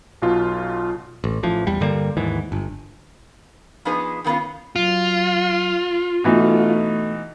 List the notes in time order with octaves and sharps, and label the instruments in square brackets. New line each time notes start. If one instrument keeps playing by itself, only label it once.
[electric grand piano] B1 B2 F4
[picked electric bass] A1
A1 E3 F3
E2 G3
G2 D3 G3 A#3
D#2 G#2 E3
G1
[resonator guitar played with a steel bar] F3 B3 D4 D#4 G#4 B4
D#3 A#3 B3 C#4 F4
[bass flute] F#3 [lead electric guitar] F4
[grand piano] B2 E3 D#4 [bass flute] A3